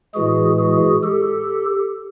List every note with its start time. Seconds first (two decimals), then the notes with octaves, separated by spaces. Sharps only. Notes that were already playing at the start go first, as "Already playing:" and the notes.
0.14 A2 E3 G#3 F#4 G#4
0.59 F#4 G#4
1.03 G4 A4